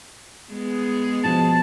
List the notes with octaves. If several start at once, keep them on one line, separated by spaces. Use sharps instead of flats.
G#3 B3 G#4
B2 F3 A5